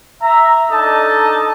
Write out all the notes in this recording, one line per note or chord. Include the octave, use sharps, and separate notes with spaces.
E5 A#5
D4 D#4 A4 D#5 A5